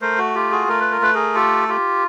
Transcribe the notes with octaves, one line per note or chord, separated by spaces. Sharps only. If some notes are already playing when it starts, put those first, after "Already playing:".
A3 A#4 C5
F#4
F4 G4
F#4 G#4
A3 A#4
B4
A#4
A3 B4
G#4 A#4
F4 G4 A4
F4 G4